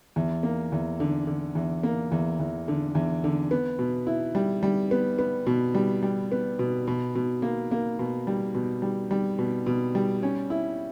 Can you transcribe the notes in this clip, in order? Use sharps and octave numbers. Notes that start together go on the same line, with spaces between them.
E2
A#3
E2
D3
D3
E2
A#3
E2
E2
D3
E2
D3
B3
B2
E4
G3
G3
B3
B3
B2
G3
G3
B3
B2
B2
B2
A#3
A#3
B2
G3
B2
G3
G3
B2
B2
G3
C#4
E4